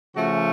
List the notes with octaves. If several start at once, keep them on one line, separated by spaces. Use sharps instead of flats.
C#3 F3 A3 C#4 F#4